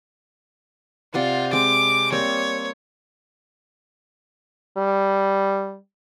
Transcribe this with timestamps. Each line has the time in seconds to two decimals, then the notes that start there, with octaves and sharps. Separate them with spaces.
1.14 C3 F4 D5 F#5
1.53 G#3 C4 D6
2.12 G3 A#3 C4 C#5
4.77 G3